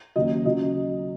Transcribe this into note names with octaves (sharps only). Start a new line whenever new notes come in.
D#2 C#3 F#3 D#5
C#3 F#3 D#5